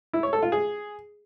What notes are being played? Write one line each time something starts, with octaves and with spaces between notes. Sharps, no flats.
E4
C#5
A4
F4
G#4